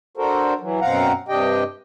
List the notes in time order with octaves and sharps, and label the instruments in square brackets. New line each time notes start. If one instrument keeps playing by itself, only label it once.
[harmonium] D4 F#4 A4 A#4 C5
E3 F#3
F#2 B2 C4 F5 F#5 A#5
G2 C3 D4 G4 D#5 G5